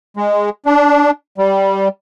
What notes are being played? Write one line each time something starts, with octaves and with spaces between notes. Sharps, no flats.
G#3
D4
G3